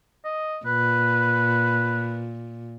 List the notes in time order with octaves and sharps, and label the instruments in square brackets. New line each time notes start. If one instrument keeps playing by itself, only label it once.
[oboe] D#5
[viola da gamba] A#2 [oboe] B4